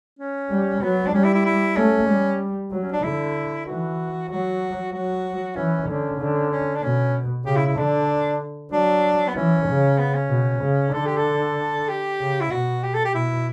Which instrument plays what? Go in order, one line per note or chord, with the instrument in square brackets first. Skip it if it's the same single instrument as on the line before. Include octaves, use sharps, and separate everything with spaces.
[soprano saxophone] C#4
[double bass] G3
[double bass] F#3 [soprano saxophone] B3
[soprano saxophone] D4
[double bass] G3 [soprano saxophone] C#4
[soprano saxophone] E4
E4
E4
[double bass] A3 [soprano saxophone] C#4
[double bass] G3
F#3
[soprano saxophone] C#4
D4
[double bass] D3 [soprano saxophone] E4
[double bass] E3 [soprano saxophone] F#4
[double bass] F#3 [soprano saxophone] F#4
[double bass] F#3 [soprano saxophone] F#4
[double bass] E3 [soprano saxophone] C#4
[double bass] D3 [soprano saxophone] C#4
[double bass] D3
[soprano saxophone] C#4
D4
[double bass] B2 [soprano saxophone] C#4
[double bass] C#3 [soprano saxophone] G4
[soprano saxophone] E4
E4
[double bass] D3 [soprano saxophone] D4
[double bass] F#3 [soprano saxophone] D4
[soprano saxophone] B3
[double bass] E3 [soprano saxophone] C#4
[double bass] C#3
[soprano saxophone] B3
C#4
[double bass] B2
C#3
[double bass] D3 [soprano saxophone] A4
[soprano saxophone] G4
A4
G4
[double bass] C#3
[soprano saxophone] E4
[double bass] B2 [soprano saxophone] F#4
[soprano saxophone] G4
A4
G4
[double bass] B2 [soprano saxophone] E4